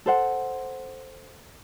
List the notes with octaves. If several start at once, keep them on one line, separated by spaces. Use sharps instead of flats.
A4 C5 F#5